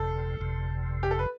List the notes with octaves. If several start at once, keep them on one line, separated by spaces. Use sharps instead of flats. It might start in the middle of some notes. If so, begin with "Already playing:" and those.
Already playing: G1 F2 C3 A4
G1 F2 C3
G4
A4
B4